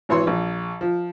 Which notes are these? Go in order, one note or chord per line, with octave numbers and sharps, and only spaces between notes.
G#1 E3 C#5 C6
A#1
F3